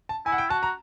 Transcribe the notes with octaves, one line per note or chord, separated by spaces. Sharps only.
A5
E4 G#5
F#5
G5
F#4 A5
A#5